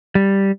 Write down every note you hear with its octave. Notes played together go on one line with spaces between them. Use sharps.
G3